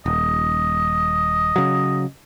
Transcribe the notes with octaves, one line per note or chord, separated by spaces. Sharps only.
D#1 D#5
C#3 F#3